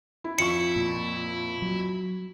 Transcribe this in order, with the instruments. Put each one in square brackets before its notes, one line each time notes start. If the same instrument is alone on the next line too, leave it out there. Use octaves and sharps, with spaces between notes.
[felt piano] E4
[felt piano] F2 F3 C#6 [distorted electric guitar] E4 [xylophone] C#7
[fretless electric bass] A#2
F#3